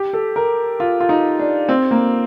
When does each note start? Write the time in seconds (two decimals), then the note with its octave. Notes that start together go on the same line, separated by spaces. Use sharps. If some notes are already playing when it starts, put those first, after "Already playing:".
Already playing: G4
0.13 A4
0.36 A#4
0.80 F4
1.00 F4
1.09 D#4
1.39 D4
1.69 C4
1.91 A#3